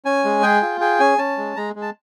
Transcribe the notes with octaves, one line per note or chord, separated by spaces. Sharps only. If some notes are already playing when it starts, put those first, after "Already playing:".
C#4 G#5
G#3
G#4 G5
F4
G#4 G5
C#4 G#5
C#4 A5
G#3
G#3 A#5
G#3
A5